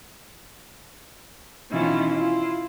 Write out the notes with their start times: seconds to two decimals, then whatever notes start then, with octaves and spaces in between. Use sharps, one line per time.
1.71 B2 D#3 E3 C#4 E4 F4
2.10 E4 F4